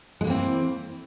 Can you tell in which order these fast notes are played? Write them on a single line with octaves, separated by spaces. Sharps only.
G#3 A#3 E3 C4